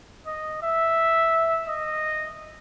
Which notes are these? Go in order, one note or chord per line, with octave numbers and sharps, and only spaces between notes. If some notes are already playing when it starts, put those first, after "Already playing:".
D#5
E5
D#5